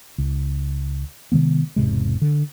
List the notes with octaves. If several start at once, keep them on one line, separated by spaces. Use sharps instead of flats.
C#2
C3 D#3 G#3 B3
E1 G#2 C3 G#3
D3